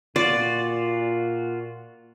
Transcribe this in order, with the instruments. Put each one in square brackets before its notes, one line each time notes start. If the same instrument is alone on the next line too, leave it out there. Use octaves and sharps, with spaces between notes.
[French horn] A#2 [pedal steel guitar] F4 F#4 [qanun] D5